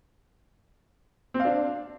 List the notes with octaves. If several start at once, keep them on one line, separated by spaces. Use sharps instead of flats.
C4
F5
D4